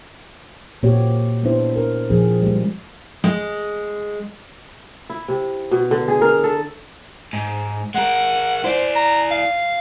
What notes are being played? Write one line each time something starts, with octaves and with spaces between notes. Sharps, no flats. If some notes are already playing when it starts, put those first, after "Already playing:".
A#2 A#3 C4 F#4 G4 C#5
B3 C4 D4 E4 C5
D4 A#4
A#2 F3 C4 G#4
G3 G#3
G#3
E4
C3
B2
D3
G#4
A#4
A4
G#2
G#3 A#4 F#5
E4 C5 D5
A#5
F5